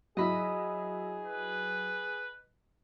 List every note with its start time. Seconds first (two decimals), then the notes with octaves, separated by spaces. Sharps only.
0.17 F#3 E4 G#4 D#5 B5
1.24 B4